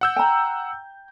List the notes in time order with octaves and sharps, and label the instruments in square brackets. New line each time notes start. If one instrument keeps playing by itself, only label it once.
[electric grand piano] F#5 E6 G6
[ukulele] G5 A#5